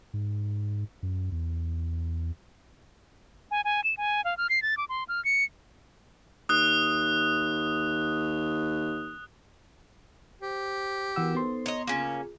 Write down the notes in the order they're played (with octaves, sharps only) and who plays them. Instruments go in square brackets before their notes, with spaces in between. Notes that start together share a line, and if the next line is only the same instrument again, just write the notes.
[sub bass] G#2
F#2
E2
[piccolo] G#5
G#5
E7
G#5
F5
F6
C7
A6
D6
C6
F6
C#7
[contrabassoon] D#2 [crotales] D#6 F#6
[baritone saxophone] G4 [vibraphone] C5
[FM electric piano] E3 F#5 E6 [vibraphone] B3 F#4 A#4
[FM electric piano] B3 C6 [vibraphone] D#4 A4 C5
[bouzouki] C#5 D#5 [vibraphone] A#5
[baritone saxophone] C#3 [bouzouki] A#3 C#4 [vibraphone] F4 G#4